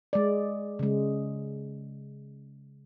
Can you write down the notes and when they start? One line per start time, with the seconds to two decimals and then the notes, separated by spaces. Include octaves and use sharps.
0.13 G#3 D5
0.79 C#3 G#3